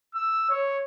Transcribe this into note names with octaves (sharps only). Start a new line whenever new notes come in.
E6
C#5